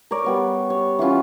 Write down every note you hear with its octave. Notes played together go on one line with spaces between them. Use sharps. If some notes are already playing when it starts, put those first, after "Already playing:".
A#4 C#5 D5
G3 B3 C#5
C#5
E3 B3 C#4 F4